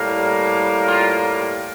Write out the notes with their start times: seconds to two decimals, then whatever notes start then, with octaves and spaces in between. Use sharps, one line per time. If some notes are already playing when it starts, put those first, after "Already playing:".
Already playing: A2 G3 A#3
0.87 F4